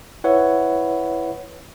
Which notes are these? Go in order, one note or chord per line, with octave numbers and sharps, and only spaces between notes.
E4 B4 C#5 E5 F#5